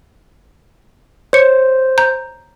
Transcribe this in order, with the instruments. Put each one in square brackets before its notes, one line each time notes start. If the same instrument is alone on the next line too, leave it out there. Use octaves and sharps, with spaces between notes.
[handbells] C5 [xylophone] C#5 C#7
[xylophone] A#5 G6